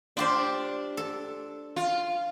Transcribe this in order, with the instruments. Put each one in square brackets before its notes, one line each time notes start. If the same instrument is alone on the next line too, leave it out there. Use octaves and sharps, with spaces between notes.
[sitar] D4 [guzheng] F4 G4 C5
[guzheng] A4
[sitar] F4